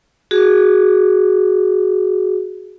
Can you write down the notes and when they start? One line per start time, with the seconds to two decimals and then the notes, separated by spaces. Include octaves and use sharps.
0.31 F#4 G#4